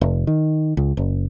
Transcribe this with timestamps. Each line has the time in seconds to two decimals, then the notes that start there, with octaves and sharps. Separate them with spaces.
0.01 F1
0.27 D#3
0.77 C#2
0.97 F#1